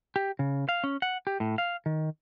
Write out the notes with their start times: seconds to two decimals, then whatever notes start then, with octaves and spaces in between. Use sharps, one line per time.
0.16 G4
0.39 C#3
0.69 F5
0.84 C#4
1.02 F#5
1.27 G4
1.40 A2
1.58 F5
1.86 D#3